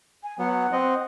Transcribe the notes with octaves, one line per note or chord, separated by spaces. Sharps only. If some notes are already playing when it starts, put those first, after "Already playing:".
G#5
F#3 B3 F#5
C4 D#5